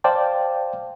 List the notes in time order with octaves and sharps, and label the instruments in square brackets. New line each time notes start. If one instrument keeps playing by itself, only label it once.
[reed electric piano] C5 D5 F5 G5 A5